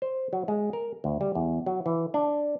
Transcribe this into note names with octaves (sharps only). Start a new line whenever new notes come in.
C5
F#3
G#3
A#4
D2
G3
E2
F#3
E3
D4